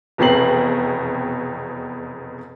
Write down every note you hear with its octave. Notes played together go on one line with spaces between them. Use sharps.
F1 E2 B2 C4 C7 F#7